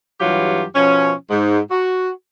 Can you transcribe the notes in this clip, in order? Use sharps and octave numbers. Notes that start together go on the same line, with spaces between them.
G2 E3 F#3 F4 G4
B2 F3 C#4
G#2
F#4